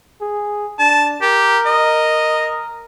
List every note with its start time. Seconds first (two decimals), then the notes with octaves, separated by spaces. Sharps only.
0.21 G#4
0.79 D4 A5
1.22 G4 A#4
1.66 D#5